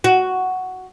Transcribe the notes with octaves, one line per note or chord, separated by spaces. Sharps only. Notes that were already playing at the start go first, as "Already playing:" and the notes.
F#4